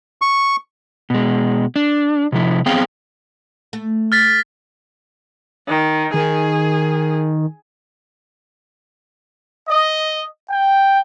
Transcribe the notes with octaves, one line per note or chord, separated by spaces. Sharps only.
C#6
B2 G#3
D4
C3 F3 E4
B3 C4 G#4 F5 G5
A3
F6 A6 B6
D#3
D#3 G#4
D#5
G5